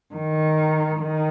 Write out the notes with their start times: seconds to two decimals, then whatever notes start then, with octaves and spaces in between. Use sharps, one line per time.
0.14 D#3
0.99 D#3